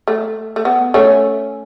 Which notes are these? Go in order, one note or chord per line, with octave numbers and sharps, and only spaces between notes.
A3
A3
B3
A3 C#4